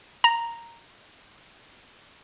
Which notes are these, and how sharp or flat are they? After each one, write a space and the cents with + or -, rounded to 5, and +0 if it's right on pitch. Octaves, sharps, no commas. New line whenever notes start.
A#5 -5